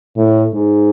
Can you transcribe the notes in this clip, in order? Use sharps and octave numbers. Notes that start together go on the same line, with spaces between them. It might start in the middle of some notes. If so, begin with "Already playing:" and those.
A2
G#2